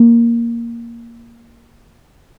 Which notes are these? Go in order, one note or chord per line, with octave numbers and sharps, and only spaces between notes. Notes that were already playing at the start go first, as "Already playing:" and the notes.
Already playing: A#3